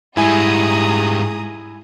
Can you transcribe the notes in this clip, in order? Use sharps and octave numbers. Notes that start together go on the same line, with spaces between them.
G#2 G3 E4 G#4 G#5 A#5 D#6